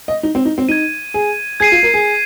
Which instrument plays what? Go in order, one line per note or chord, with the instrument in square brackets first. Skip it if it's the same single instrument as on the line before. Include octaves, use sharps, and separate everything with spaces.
[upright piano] D#5
D#4
C4
D#4
C4
[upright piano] D#4 [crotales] G#6 D#7
[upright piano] G#4
[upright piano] G#4 [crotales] G#6 C7 D#7
[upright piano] F4
A#4
G#4